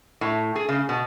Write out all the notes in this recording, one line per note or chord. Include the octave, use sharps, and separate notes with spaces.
A2
G#4
C#3
B2